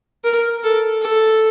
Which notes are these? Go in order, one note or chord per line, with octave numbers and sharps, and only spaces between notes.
A#4
A4
A4